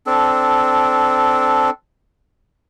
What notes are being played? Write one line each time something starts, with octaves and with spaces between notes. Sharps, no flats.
C4 D4 A4